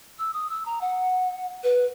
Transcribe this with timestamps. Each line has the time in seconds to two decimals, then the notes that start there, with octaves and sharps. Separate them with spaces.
0.19 E6
0.33 D#6
0.50 E6
0.66 A#5
0.81 F#5
1.64 B4